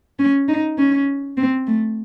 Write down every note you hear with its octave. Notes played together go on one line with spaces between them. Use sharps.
C#4
D#4
C#4
C4
A3